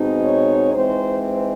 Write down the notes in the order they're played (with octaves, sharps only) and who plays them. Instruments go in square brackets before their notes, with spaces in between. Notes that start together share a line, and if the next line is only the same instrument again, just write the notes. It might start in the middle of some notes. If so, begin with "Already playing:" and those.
Already playing: [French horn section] B2 G#3 C4 D#4
C#5
E3 G#3 C4 D#4 C5